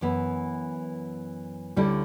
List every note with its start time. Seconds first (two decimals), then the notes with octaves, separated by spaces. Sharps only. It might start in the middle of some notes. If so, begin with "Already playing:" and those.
0.01 F#2 E3 B3 E4
1.76 D2 D3 G3 C#4 E4